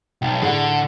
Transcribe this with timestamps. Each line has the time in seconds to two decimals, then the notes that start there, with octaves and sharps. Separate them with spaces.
0.22 B1 G5
0.42 A2 D3 G#4 F#5